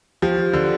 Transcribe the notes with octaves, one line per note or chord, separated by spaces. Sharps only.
F3 G4
G4
D3